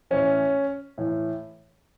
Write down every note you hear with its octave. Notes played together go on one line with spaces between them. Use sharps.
A2 E3 C#4
A2 E3